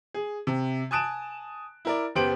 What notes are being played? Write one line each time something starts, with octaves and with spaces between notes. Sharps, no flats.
G#4
C3
G#5 A5 D#6 F#6 D7 E7
E4 A#4 D5
F#1 B3 G4 C5 D7 F#7